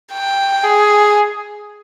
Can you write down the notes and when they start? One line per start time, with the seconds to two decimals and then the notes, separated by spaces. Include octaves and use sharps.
0.13 G5
0.63 G#4